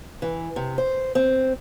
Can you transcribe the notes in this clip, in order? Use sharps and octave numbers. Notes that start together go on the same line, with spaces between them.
E3
C3
C5
C4